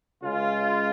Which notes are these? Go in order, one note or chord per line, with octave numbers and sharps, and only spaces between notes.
C#2 C#3 G#3 F4